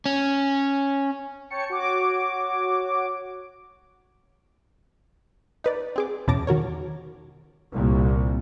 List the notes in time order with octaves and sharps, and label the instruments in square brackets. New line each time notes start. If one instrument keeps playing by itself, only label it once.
[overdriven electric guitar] C#4
[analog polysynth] C#5 G5 A5 C#7
F#4 C#5 D6
[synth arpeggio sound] D#4 B4 D5
C4 G#4 D6
E2 B2 C#4 A5 D6 A#6
D#3 F#4 A#4 C#5
[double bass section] C2 A#2